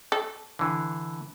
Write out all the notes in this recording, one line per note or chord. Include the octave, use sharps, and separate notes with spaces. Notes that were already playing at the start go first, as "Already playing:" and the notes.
A4
D3 E3